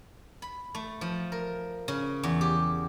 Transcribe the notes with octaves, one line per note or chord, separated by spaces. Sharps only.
B5
A3
F3
A#4
C#3
E2
G4